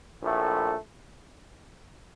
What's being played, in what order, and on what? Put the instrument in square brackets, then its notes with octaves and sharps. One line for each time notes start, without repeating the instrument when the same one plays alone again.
[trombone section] A#1 A2 A3